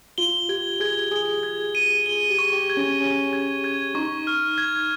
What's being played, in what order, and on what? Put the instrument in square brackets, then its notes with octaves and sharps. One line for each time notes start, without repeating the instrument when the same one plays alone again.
[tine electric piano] F4 [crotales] G7
[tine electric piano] G4 [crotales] G#6
[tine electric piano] G#4 [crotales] G#6
[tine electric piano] G#4 [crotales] G7
[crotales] G#6
D#7
[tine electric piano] G#4 [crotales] G7
[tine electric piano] G4
[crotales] C#6
[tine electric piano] G4
[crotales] G#6
[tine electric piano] C#4
[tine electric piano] C#4 [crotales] G7
[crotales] G#6
G#6
[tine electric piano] D#4 [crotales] C#6
[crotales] F6
G#6